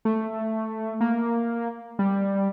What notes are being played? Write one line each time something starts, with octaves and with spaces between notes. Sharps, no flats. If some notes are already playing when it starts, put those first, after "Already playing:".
A3
A#3
G3